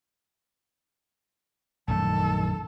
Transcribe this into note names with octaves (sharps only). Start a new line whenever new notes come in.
A#1 F#2 D#3 A3 A4